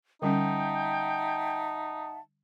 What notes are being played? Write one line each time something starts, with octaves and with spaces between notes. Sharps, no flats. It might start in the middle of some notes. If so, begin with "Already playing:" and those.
D3 G3 C#4 D#4 E5 F#5 G5 A5